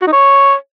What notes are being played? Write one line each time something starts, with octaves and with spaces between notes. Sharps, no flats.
F#4
D#4
C#5